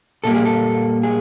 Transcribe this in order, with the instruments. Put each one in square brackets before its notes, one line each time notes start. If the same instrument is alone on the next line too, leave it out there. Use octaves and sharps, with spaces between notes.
[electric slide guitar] A#2 G3 A#3 A4
G#4
A4
G#4